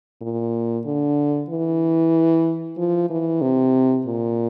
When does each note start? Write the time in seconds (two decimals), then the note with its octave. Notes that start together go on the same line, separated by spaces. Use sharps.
0.21 A#2
0.85 D3
1.49 E3
2.77 F3
3.10 E3
3.42 C3
4.06 A#2